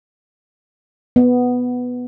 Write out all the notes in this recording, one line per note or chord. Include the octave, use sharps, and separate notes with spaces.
B3